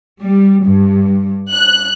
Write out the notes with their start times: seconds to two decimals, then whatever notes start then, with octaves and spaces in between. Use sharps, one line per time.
0.22 G3
0.67 G2
1.52 F#6